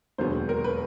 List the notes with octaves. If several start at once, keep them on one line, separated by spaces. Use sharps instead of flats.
E1 D#2 D3 F#3 B3 C5
A#4
B4